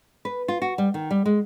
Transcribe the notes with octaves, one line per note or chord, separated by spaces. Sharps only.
B4
F4
F#4
G3
D#3
G3
G#3